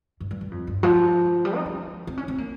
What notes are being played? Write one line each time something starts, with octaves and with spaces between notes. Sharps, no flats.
G2
G2
G2
F2
G2
F3
G3
D#4
C#4
C4
C#4
C4
A#3